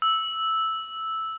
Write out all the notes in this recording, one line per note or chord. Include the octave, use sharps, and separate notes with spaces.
E6